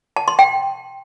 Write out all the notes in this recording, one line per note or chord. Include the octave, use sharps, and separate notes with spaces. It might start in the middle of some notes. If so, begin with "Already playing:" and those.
A5
C6
G5